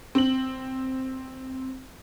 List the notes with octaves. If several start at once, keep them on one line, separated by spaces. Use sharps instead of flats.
C4 F#7